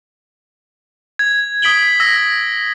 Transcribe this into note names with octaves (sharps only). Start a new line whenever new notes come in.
G#6
D#6 B6 D7 F#7 G7
E6 A#6